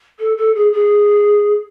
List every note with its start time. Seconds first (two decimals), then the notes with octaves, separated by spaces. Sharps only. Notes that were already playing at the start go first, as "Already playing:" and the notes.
0.19 A4
0.37 A4
0.55 G#4
0.73 G#4